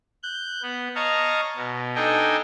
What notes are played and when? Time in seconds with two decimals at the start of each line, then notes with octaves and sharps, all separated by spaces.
0.23 F#6 G6
0.63 B3
0.95 C#5 D#5 F5 A5 A#5 C#6
1.56 B2
1.95 D4 D#4 A4 D#5 G5 G#5